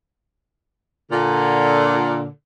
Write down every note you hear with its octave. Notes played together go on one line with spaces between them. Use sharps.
A#2 D3